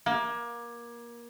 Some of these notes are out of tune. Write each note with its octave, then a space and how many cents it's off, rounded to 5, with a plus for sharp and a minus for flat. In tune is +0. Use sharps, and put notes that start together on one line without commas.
A#3 +25